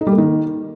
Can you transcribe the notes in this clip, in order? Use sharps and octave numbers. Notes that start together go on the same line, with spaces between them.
D#4
G3
A#3
D#3